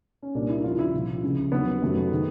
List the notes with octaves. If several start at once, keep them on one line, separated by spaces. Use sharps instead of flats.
C#4
C2 A#2 G3 A#3 D4
E4
E4
D#2 C#3 F3 F4
E4
C2 A#2 F3
C#2 C#3 F3
D#2 D3 F#3 B3
F#2 D#3 F#3 A3
D#3 G#3